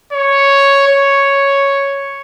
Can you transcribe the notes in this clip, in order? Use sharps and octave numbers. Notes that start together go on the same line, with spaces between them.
C#5
C#5